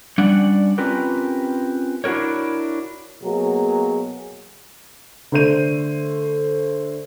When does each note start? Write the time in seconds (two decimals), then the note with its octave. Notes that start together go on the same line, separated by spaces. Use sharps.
0.18 G3 C#4 D4 D5 F#5
0.78 C4 C#4 F4 G4 A#4 B4
2.04 D4 E4 F#4 A#4 C#5
3.23 B2 F#3 A#3 F#4 G#4
5.32 D3 A3 C5 G6 D#7